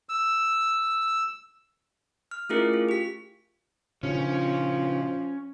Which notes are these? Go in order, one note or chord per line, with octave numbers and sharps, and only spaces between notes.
E6
F6
A3 C#4 E4 F4 G#4 A#4
F4
G4 B6
A#2 C#3 F3 C#4 D4